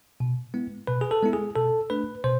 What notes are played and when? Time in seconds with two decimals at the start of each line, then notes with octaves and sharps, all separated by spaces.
0.20 B2
0.54 G#3 B3 E4
0.87 B2 B4
1.01 G#4
1.11 A4
1.23 G#3 B3 E4
1.33 G#4
1.56 B2 A4
1.90 A3 D4 B4
2.24 B2 C5